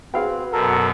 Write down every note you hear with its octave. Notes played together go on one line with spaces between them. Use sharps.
C4 F#4 G#4 B4 F5 G5
F#2 B2 A4 A#4